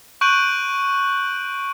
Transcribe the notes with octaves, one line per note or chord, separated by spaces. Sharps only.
C#6 F#6 G6 D7 D#7 F#7